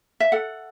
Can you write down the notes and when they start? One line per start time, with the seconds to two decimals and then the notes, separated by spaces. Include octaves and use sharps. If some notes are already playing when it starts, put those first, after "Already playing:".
0.20 E5
0.32 A4 F#5